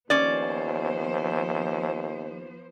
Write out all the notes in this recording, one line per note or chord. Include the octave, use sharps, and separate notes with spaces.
D#2 F3 B3 C#4 C5 D5